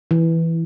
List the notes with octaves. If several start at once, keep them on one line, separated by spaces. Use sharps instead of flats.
E3